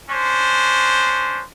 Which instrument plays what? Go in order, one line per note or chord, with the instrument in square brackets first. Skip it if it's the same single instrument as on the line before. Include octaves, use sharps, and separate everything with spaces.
[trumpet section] C#4 D4 C5